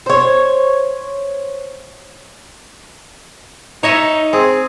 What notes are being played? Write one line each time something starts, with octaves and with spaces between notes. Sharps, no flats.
C5 C#5
D#4 C#5 D#5 E5
C4 G#4